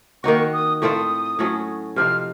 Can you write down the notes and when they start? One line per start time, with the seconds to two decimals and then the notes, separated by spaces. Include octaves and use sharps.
0.23 D#3 A#3 D#4 F#4 C#6
0.53 D#6
0.81 A2 A3 C4 F4 D#6
1.39 A2 F#3 A3 C#4
1.96 C3 F3 C4 D#4 F6